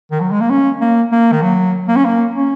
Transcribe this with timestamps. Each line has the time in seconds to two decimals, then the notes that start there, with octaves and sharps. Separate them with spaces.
0.11 D#3
0.20 F#3
0.31 G#3
0.41 A#3
0.50 C#4
0.81 A#3
1.12 A#3
1.32 D#3
1.42 F#3
1.88 A#3
1.96 C#4
2.05 A#3
2.34 C#4